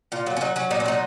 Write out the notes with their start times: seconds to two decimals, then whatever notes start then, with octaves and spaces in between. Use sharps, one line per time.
0.12 A#2 F4
0.26 F#3
0.37 C#4
0.41 F#3 D#4
0.56 F#3 C#4
0.71 A#2 D#4
0.80 C#4
0.86 F#3 D#4